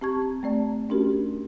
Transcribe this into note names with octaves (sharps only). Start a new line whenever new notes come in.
C4 G4 A5 C#6 G#6
C4
A3 C4 D5 A5
A3 C#4 D4 F#4 G4 A#4